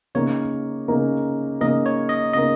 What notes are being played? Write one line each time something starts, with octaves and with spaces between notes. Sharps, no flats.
C#3 A#3 D#4 A#4 C#5
C#3 A#3 D#4 A#4
C#3 A#3 D#4 A#4 D#5
C#5
D#5
C#3 A#3 D#4 A#4 D#5